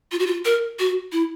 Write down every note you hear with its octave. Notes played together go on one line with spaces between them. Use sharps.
F4
F#4
F4
A#4
F#4
E4